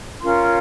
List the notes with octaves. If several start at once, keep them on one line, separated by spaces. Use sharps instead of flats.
C#4 F4 A#4 C#5 C6